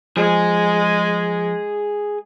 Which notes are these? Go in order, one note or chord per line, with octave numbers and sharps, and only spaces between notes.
F3 G#3 G#4